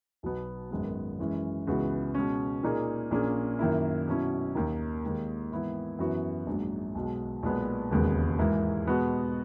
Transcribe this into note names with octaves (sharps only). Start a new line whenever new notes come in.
B1 B2 F#3 B3
G#1 F#2 D#3 G#3 B3
F#2 E3 G#3 C#4
C#2 C#3 E3 B3 F#4
B2 G#3 C#4
A#2 A#3 D#4 G#4
A#1 A#2 A#3 C#4 G#4
F#2 D#3 A#3 E4
B2 F#3 C#4 E4
D#2 D#3 A#3 D#4
D#2 D#3 G#3
G#2 E3 B3 E4
F#2 E3 B3 F#4
A#1 G#2 F#3
B1 B2 G#3
B1 A#2 G#3 B3
E1 D#2 C#3 G#3 B3
G#2 E3 A#3 E4 G#4
B2 G#3 B3 F#4